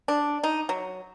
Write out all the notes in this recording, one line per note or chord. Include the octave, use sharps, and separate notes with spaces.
D4
D#4
F#3